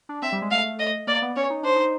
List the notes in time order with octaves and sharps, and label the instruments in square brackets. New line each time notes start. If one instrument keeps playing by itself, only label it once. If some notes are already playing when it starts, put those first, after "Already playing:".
[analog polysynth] D4
[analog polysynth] C4 [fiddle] E5
[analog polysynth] G3
G#3
[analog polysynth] A3 [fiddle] F5
[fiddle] D#5
[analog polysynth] A#3 [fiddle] D5
[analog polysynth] B3
[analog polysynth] C#4 [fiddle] C#5
[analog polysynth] D#4
[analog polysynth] D4 [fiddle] C5
[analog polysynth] D#4